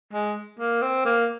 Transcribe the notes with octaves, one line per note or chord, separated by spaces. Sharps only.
G#3
A#3
C4
A#3